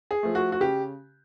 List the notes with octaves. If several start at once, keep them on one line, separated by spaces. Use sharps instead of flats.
G#4
F3 A3
F#4
F#4
C#3 G4